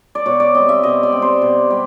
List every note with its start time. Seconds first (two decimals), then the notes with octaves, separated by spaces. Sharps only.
0.15 D5
0.26 B2 C#5
0.40 D5
0.55 G3 C4 D#5
0.69 E5
0.83 B2 D#5
1.03 D5
1.12 G3 C4
1.22 C5
1.42 B2
1.70 G3